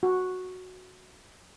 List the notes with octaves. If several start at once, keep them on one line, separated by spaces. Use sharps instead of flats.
F#4